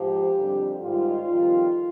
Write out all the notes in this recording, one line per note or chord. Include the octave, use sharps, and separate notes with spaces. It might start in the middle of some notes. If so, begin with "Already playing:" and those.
Already playing: G#2 F3 G4
F2 D3 G3
G#2 D#3 G3 F4
F2 D#3 G3